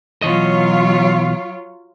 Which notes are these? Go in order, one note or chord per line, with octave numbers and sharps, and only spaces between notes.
B2 E3 F#3 F4 C#5 D#5